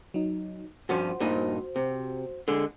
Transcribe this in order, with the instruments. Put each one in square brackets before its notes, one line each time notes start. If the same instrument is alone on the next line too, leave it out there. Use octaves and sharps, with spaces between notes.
[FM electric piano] F#3 D#4
[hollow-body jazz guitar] G2 F3 C#4 [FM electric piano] F#4 C5
[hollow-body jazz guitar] G2 A#2 D#4
C3
D3 G#3